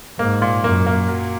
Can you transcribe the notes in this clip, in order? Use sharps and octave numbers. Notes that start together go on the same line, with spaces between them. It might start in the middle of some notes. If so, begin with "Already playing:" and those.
G#2 A#3
A#2
F#2 A#3
A#3
F#3